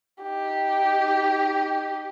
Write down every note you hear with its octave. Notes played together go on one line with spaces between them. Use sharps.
D#4 G4